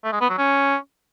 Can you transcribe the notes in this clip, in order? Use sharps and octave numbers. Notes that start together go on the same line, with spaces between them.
A3
G#3
B3
F#3
C#4